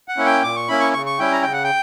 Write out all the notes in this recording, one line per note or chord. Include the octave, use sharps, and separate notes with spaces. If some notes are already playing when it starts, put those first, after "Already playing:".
F#5
A#3 C#4 E4
G5
A#2 D6
C#6
A#3 C#4 E4 B5
C#6
C#3 C#6
C#6
G3 C#4 E4 G5
A#5
C#3 G5
F#5
G5